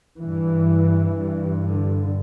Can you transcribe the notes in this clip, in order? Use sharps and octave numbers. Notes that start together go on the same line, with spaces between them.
G2 E3
G2
D3